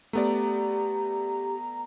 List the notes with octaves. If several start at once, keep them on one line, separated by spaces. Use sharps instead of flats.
A3 B3 G4 D5 A#5